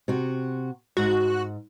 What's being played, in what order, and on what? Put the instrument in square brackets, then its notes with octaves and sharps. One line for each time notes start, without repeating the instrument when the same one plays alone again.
[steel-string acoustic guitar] C3 F#4
[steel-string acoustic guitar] G#2 [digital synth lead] F#4